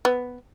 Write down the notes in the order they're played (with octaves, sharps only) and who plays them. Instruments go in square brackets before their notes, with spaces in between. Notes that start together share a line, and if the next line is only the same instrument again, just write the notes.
[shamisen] B3